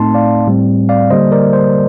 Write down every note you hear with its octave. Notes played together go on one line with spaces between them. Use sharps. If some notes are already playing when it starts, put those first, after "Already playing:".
Already playing: A2 A3 C4 D#4 A5 C6
D5 F5
A2 G3 C4
D5 F5
D3 G3 A#3 C5 D#5
A#4 D5
C5